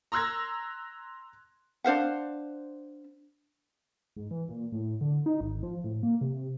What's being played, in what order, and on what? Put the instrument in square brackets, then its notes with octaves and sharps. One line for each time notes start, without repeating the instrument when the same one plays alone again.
[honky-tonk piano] A#5 C6 E6 F#6 G#6 A#6
[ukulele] D4 C5 F5 F#5
[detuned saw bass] G#2
E3
A#2
A2
D3
D#4
G#1
F3
A2
A#3
C3